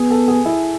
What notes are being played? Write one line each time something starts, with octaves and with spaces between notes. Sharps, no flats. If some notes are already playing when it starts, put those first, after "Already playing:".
Already playing: B3 G#4
A4
G#4
E4